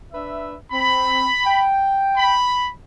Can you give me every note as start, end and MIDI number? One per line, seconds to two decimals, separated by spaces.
0.13 0.54 62
0.13 0.54 71
0.13 0.54 76
0.71 1.27 60
0.71 1.65 83
1.45 2.34 79
2.17 2.70 83